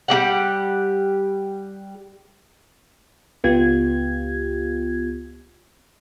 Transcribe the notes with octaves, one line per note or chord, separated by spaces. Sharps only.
G3 C4 G4 F#5
C#2 B3 F4 G4 G#6